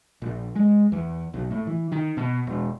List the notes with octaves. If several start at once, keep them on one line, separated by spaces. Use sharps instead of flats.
A#1
G#3
E2
B1
A2
E3
D#3
B2
E1